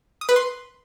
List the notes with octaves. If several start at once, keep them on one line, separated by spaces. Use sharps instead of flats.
D#6
B4
C6